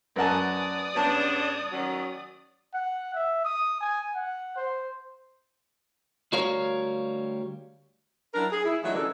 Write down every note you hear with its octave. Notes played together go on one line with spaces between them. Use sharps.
F#2 A#4 B4 D5 F#5 G#5 A5 D#6
G2 C#3 B3 D4 A5
D#3 F#3 C#4
F#5
E5
D#6
G#5
F#5
C5
D2 G3 F#4 A#4 C#5 F5
F#3 D4 E4 A#4
G#4
E4
E3 F#3 G#3 A3 D4 F4
C#3 E3 G#3 D4 A4 A#4